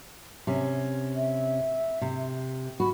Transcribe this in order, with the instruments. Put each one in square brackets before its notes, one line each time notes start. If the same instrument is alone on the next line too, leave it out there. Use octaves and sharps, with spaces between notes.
[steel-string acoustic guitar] C3 C#4
[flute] E5
[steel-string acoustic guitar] C3
[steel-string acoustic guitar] F#4 [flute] B5